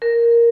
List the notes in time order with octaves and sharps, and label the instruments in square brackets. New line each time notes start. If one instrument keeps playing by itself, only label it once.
[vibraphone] A#4